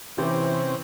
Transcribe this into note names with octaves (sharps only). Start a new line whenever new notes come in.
C3 E3 C4 C#4 E4 G4 C5